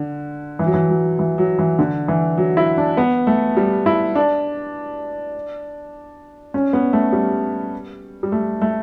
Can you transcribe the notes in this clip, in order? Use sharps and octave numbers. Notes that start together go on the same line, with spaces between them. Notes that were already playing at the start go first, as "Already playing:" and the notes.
Already playing: D3
E3
F#3
E3
F#3
E3
F#3
E3
D3
E3
F#3
E4
D4
B3
A3
G3
E4
D4
C#4
B3
A3
G3
G3
A3
A3